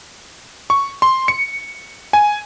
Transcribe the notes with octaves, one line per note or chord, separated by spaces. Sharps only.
C#6
C6
C#7
G#5